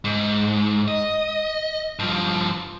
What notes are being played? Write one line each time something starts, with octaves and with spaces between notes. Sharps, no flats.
G#2
D#5
G2 F3